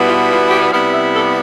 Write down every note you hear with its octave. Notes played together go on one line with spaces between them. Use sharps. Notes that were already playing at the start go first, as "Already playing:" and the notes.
Already playing: B2 G3 B3 E4
F4
F4
G4
C3 G3 B3 E4 F5
E5
A4